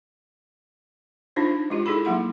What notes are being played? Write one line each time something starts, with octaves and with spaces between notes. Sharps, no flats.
D4 D#4 F4 C5
G#3 F4 G4
D#4 E4 G#4 A4 B5
F#3 A#3 F#5 C6